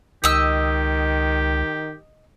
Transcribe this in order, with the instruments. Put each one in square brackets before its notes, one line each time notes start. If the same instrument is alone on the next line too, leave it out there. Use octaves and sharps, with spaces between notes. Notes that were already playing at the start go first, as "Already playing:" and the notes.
[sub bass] C#2 [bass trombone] D#3 [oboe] G4 [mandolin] D#5 E6